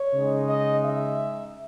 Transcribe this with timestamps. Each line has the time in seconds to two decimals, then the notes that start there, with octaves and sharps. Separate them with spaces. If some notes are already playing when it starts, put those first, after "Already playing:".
Already playing: C#5
0.13 C#3 G#3 D#4
0.48 D#5
0.83 E5